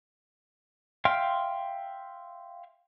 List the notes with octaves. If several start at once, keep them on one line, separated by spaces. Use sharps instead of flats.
E5 F5 G5 C6 F6